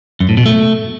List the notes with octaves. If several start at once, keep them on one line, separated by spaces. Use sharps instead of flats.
F#2
A2
B2
A3